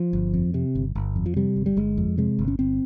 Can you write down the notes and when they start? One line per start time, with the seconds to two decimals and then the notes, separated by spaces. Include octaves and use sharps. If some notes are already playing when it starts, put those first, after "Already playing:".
Already playing: F3
0.13 G1
0.34 F2
0.54 C3
0.75 G1
0.95 G1
1.16 F2
1.26 F3
1.36 C3 G3
1.56 G1
1.66 G3
1.77 G1 G#3
1.98 F2
2.18 C3 G#3
2.39 G1
2.48 C#4
2.59 G1 C4